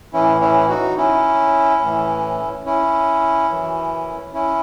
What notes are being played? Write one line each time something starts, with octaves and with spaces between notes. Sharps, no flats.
A2 E3 C#4 E4
C#4 E4
D#4 F#4
C#4 E4
A2 E3
C#4 E4
F#2 E3
C#4 E4